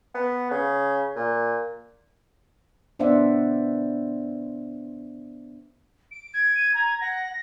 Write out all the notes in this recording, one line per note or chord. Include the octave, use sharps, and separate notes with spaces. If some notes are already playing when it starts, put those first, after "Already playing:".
B3
C#3
A#2
B3 D4 C5 D5 E5 F#5
D7
G#6
D#7
A#5 G#6
F#5 A#6